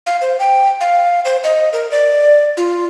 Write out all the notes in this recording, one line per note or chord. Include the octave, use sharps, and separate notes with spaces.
F5
C5
G5
F5
C5
D#5
A#4
D5
F4